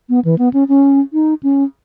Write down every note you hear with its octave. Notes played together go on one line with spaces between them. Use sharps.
B3
E3
B3
C#4
C#4
D#4
C#4